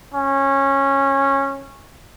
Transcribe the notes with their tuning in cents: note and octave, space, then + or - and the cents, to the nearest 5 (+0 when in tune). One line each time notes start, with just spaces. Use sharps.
C#4 -15